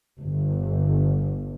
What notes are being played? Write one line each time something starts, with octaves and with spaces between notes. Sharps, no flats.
G1